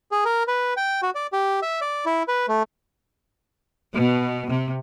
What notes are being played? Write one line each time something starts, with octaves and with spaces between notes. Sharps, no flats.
G#4
A#4
B4
G5
F#4
D5
G4
E5
D5
E4
B4
A3
B2
C3